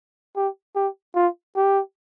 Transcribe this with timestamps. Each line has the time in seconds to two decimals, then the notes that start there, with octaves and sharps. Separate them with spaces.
0.36 G4
0.76 G4
1.15 F4
1.56 G4